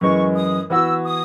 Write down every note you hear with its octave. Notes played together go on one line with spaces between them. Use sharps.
F#2 E3 G#3 C#6
D#6
E3 B3 F#4 E6
D#6